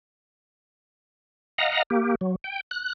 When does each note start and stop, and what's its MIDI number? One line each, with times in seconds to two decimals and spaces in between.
1.58 1.83 75
1.58 1.83 77
1.58 1.83 78
1.58 1.83 82
1.90 2.15 58
1.90 2.15 67
2.21 2.35 54
2.44 2.61 79
2.71 2.93 90